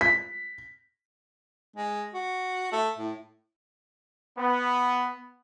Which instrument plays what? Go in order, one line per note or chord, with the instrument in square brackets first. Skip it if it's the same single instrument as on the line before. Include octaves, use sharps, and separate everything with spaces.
[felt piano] B6
[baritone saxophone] G#3
F#4
A3
A2
[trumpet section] B3